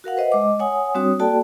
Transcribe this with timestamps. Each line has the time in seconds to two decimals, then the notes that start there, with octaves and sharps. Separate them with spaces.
0.04 F#4 A#4 F5 F#5
0.17 B4 C5 D#5 E5 F#5
0.32 G#3 D#5 D6
0.59 C#5 F#5 G#5 D#6
0.95 G3 C4 D4 F#4 C#5 D#6
1.20 A#3 F#4 A4 D5 G5 A5